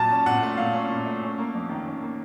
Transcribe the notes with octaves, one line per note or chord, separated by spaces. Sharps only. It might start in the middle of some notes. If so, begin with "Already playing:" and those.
Already playing: A#2 F#3 A5
C#4
A#2 F#5
A3
A#2 F5
C#4
A#2
A3
C#4
A#3
F2
D#3
C#4
A#3